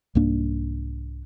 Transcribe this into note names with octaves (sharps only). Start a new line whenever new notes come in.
C2 G#2 A#3 D4